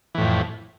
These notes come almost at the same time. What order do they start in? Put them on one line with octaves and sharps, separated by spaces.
E3 A2 F2